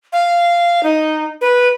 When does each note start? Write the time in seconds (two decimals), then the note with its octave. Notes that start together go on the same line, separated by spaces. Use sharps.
0.13 F5
0.83 D#4
1.41 B4